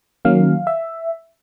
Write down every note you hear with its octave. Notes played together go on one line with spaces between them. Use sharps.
D#3 F#3 A#3 C#4 F5
E5